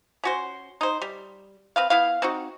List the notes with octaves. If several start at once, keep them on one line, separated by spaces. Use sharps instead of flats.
C#4 F#4 C5
D#4 C5
G3
C4 B4 F5
B3 E4 F5
C4 D#4 F#4